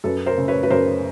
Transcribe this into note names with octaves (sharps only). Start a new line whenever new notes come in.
F#2 A4 B4
A#4 C5
C#3
B4 C#5
B4
F#2 A#4 C5